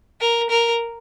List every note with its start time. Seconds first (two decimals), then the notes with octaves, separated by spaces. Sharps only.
0.20 A#4
0.50 A#4